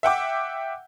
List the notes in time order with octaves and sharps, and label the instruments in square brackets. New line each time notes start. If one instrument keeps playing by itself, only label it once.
[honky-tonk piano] E5 F#5 G5 D6